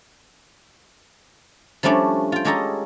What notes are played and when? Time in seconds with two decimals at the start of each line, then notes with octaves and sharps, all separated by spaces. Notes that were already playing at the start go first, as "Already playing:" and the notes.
1.83 F3 G3 A3 C#4 D4
2.32 F4 G5
2.45 G#3 C#4 G4 A4 D#5 A#5